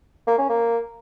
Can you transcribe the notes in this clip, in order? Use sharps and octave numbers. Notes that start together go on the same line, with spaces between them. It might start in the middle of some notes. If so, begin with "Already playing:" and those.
A#3
C#4
A#3